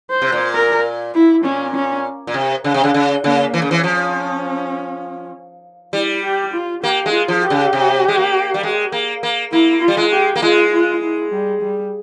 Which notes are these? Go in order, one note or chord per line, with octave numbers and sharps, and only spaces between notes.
C5
C3
A#2
A#4
E4
A#2 C#4
C#4
A#2
C3
C#3
C3
C#3
C#3
C#3 A#3
E3
C#3
E3 C#4
F3
G3 E4
G4
F4
A#3 G4
G#3
F4
F3
G4
C#3
C3
G#3
A#3
G3
G#3
A#3
A#3
A#3 E4
F4
G3
G#3
G4
A#3
G#3 F4
F4
E4
G3
G3